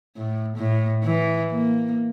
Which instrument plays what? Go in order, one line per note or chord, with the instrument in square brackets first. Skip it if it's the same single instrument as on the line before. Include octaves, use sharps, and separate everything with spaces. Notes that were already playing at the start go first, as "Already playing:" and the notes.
[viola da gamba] A2
A2
E3
A#3